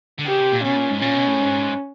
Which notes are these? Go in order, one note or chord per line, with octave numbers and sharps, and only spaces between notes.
D3
C#3 G4
C3
A#2
B2 C#4
A#2
G#2
A#2 C#4
B2
A2
G#2